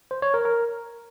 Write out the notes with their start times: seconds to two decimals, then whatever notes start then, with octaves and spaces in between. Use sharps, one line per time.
0.11 C5
0.22 C#5
0.34 A#4
0.45 A#4